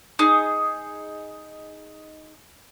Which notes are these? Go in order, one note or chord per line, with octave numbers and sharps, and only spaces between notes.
D#4 G#4